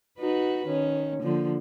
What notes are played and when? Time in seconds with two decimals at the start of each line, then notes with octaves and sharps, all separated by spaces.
0.19 D#4 F#4 B4
0.67 D#3 C#4
1.22 D3 F3 A#3